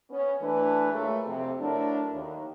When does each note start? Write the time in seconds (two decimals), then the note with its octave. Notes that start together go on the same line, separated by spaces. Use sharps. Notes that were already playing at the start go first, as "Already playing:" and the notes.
0.10 B3 C#4
0.41 E3 A3 D4 B4
0.90 A#2 F#3 G#3 A3
1.26 F2 C3
1.60 F#3 A3 D4 E4 A#4
2.12 D#2